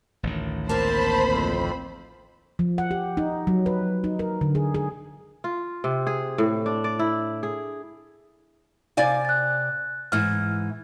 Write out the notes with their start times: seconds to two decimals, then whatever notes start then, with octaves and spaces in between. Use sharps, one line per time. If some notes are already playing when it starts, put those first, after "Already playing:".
0.23 A1 D2 D#3
0.69 A#3 C4 A#4 C5 A5 B5
1.26 F2
2.59 F3
2.78 F#5
2.91 G4
3.17 D#4
3.47 F#3
3.66 B4
4.04 D#4
4.19 A#4
4.41 D3
4.55 G#4
4.75 G#4
5.44 F4
5.84 C3
6.07 G#4
6.38 A2
6.66 D4
6.84 D5
6.99 E4
7.43 G#4
8.97 C3 D5 F5 G#5 A6
9.25 F#6 A6
10.12 G#2 E3 F6